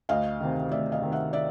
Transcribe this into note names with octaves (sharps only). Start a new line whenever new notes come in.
D2 D#5 F5
C3 D#3
D2 D5 E5
D#5 F5
C3 D#3
E5 F#5
D5 E5